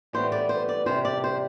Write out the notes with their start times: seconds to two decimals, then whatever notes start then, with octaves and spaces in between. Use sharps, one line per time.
0.13 A2 E3 G3 B3 C5
0.32 D5
0.49 C5
0.69 D5
0.86 E2 C3 G3 C5
1.05 D5
1.24 C5